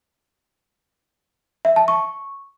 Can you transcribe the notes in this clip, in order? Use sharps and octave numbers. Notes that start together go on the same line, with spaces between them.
E5
A5
C#6